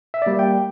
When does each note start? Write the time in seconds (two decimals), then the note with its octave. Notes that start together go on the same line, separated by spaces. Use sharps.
0.14 E5
0.22 D5
0.26 G3 A#3 E5
0.39 G5